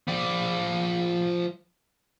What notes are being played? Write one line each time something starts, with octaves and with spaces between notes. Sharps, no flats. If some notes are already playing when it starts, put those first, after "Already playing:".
F3 D5